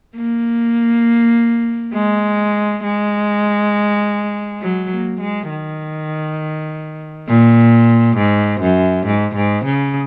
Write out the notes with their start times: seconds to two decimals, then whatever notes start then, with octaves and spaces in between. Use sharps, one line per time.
0.16 A#3
1.93 G#3
2.83 G#3
4.61 F#3
4.90 A#3
5.20 G#3
5.50 D#3
7.28 A#2
8.17 G#2
8.61 F#2
9.06 G#2
9.35 G#2
9.65 C#3